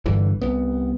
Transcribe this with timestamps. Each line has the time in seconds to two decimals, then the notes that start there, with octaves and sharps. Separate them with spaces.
0.06 G1 G2 D3 E3
0.42 C2 B3